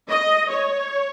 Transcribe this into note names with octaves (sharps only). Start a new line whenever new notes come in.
D#5
C#5